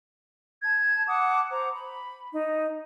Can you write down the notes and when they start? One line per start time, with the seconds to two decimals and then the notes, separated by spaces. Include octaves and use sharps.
0.62 A5 G#6
1.08 F#5 A5 D6 D#6
1.50 C5 A#5 D6
1.72 B5
2.31 D#4